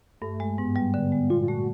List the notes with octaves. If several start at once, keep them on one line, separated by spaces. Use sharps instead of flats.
G2 A3
G#3
G#2 B3
G3
D3
G#3
A#2 F4
F4
A3 F#4